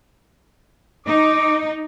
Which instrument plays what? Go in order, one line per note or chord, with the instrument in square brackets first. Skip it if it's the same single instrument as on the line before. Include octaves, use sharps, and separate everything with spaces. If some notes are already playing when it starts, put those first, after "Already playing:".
[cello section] D#4 [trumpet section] D6